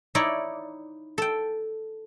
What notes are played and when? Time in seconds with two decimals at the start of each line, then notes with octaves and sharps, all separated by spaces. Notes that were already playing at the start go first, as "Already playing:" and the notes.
0.15 D#4 E4 C#5 D5
1.18 A4 G5